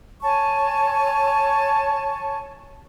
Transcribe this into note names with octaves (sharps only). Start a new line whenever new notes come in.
C#5 G#5 A5 C#6